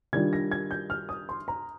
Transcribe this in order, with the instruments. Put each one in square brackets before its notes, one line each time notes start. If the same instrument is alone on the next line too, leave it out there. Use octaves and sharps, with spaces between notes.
[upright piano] D#3 G3 D4 F4 G#6
A#6
G#6
G6
F6
D#6
C6
A#5